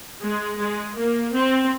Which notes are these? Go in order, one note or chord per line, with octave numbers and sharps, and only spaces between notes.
G#3
G#3
A#3
C4